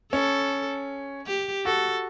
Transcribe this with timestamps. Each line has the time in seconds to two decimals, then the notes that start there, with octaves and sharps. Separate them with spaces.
0.12 C#4 A4
1.26 G4
1.65 F#4 A4